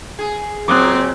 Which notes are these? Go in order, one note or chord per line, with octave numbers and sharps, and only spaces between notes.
G#4
A#2 C#3 F#3 C4 D6 D#6 F#6